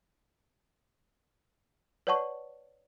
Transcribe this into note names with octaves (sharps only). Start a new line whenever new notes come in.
B4 C#5 D5 F#5 A5 C#6